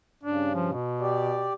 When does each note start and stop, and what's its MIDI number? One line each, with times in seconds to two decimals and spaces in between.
0.23 0.73 43
0.23 0.73 49
0.23 0.55 62
0.55 0.68 53
0.73 1.50 47
1.00 1.53 67
1.00 1.53 74